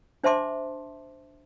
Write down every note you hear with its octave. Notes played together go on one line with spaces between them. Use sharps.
D4 C5 E5 A5 C6 D6